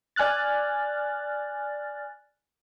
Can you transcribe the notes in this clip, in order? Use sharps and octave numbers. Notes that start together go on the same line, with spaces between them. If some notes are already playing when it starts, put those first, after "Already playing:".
D5 G#5 F6 F#6 A6